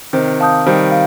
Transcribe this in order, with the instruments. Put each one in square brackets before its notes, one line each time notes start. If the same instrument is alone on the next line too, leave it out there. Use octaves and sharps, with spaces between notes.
[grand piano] C3 D#3 [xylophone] C5
[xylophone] F5 A5 D#6 G6
[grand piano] D#3 G3 [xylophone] C5
[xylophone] F5